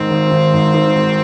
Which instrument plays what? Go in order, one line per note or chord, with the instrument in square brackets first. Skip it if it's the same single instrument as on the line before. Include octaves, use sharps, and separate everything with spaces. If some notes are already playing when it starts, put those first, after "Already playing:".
Already playing: [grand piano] G#2 D#3 [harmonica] C4
[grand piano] G#1
G#1
G#2
D#3
G#1